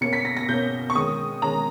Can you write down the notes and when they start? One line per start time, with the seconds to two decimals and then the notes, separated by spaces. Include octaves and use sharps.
0.01 B2 A#3 C#4 C#7
0.13 B6
0.25 A#6
0.37 A#6
0.49 B2 A#3 C#4 G6
0.90 C#6
0.95 D#3 G#3 C#4 D#6
1.42 D#3 G#3 C#4 A#5